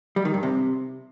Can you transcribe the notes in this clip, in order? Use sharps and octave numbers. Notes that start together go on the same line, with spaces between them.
G3
D#3
G2
C3